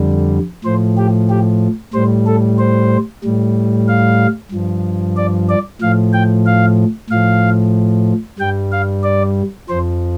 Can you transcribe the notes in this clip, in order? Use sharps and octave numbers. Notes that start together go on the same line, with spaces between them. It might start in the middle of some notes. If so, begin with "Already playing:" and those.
Already playing: F2 D3 G3
A2 F3 C5
G4
G4
A2 G3 C5
A4
C5
A2 G3
F5
G2 F3
D5
D5
A2 F3 F5
G5
F5
A2 F3 F5
G2 G3 G5
F5
D5
F2 F3 C5